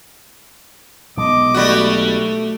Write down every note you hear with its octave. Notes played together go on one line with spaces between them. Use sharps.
B1 B2 G#3 D#5 D6
G3 A3 F#4